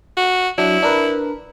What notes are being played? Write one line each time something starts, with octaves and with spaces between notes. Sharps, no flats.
F#4
F#3 D4 E4
D4 A#4 B4